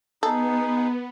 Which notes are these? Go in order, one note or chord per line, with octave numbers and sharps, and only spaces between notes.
B3 D#4 G#4 A4